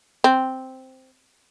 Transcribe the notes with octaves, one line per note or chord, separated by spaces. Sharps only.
C4